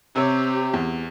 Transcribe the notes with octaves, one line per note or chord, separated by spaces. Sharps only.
C3 C4 G4 C#5
E2